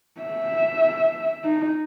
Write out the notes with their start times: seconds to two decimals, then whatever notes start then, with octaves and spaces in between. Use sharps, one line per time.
0.21 E5
1.44 D#4